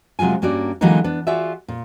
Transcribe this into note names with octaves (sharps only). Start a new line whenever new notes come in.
C3 F#3 G#3 F4 G#5
G2 A#3 C#4 F#4 D5
D3 E3 F#3 G#3 A#3 D#4
B3 D4
F4 F#4 G#4 D5 E5
A#2